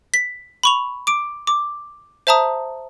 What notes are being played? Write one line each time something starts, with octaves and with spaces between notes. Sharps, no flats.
B6
B5 C#6 F7
D6 D7
D6
C5 E5 A5 A#5 D#6